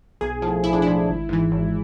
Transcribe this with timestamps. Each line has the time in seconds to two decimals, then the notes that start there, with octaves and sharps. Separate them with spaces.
0.21 B1 G#4
0.42 A2 F3
0.64 B1 E4
0.73 D4
0.82 A2 F3 E4
1.08 G#1
1.29 G#2 E3
1.52 G#1